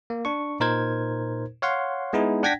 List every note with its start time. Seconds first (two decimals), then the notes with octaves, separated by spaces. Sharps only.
0.10 A#3
0.25 D4 C#6
0.60 A#2 D#4 A#4 C5 G#6
1.62 C#5 F5 F#5 C6
2.13 G#3 B3 D#4 E4 G#4
2.43 D4 F#5 G5 G#6 A#6 B6